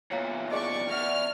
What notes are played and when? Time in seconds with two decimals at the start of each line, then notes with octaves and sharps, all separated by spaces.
0.11 E2 A#2 C#5 F5 A#5
0.51 G#4 D5 D#5 C#6
0.89 E2 D5 F#5 C#6 F6